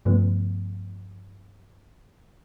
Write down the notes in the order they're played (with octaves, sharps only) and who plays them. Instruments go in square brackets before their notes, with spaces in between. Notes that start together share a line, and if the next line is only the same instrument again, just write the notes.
[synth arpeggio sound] G2 C#3 F3 A3 B3